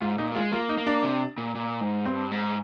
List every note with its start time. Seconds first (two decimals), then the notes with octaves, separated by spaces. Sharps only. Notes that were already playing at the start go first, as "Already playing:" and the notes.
0.01 G#2 F4
0.18 A#2 D#4
0.32 A#3
0.35 G#3 F4
0.52 A#3 F4
0.69 D#4
0.77 A#3
0.87 D4
1.03 C3
1.38 A#2
1.55 A#2
1.81 G#2
2.05 G2 C4
2.31 G#2